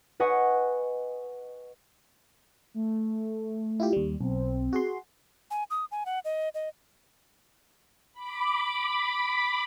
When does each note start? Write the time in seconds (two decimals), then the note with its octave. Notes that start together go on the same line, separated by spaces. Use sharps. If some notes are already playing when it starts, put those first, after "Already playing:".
0.20 B4 D#5 F#5 G#5 C#6
2.74 A3
3.80 E4 F4 G4
3.93 D#2 G3
4.21 B1 C4
4.73 F#4 G#4 C6
5.51 G#5
5.70 D#6
5.91 G#5
6.06 F#5
6.25 D#5
6.54 D#5
8.13 B5 D6